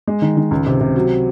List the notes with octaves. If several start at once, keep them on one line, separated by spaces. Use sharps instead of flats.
G#3
D#3
D#3
C#2
C3
C3
F#3